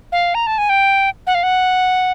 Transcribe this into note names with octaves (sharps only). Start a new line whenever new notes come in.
F5
A#5
A5
G#5
G5
F#5
F5
F#5